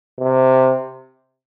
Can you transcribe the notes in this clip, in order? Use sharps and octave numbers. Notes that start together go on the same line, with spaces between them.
C3